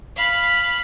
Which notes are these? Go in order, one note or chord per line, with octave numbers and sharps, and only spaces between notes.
F5 B5